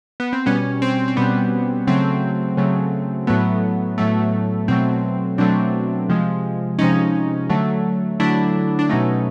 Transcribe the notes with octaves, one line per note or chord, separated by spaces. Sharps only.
B3
C4
B2 G3 B3 C#4
C4
C4
B2 G3 B3
C#3 F#3 A3 C4
C#3 F#3 A3
A2 F#3 A3 B3
A2 F#3 A3
B2 F#3 A3 C4
B2 F#3 A3 C4 D4
C3 F3 G#3
C3 F3 G#3 C#4 D#4
D3 F#3 A3
D3 F#3 A3 D4 E4
D4
B2 F#3 A3 C#4 D#4